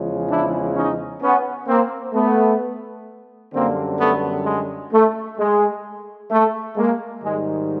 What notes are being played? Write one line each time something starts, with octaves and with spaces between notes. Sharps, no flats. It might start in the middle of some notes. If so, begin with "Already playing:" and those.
Already playing: E2 C#3 F3 G#3
D4 E4
C#4 D#4
B3 C#4
A#3 C4
A3 B3
F#2 D3 G3 A#3 C4
A3 B3
G#3
A3
G#3
A3
G#3 A#3
G#2 D#3 G3 G#3